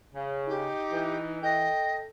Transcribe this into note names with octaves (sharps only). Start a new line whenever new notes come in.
C#3
D#4 G4
E3
A4 D#5 G5